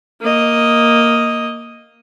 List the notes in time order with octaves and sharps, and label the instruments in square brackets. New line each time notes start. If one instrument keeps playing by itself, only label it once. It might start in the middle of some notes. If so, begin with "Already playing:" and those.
[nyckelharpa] A#3 D#5